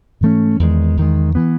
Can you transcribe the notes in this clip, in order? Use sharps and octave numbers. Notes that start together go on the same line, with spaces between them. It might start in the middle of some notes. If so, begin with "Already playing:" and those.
G#2 E3 A3 C#4
E2 D#3 G#3
E2 D#3 G#3
E3 B3